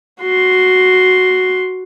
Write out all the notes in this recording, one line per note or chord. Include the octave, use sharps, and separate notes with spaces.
F#4 C6